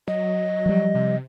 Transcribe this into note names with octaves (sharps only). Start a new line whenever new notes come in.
F#3 D#5
F3 G3
C3